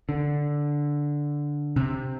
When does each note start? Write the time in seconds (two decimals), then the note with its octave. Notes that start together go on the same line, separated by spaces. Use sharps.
0.09 D3
1.76 C3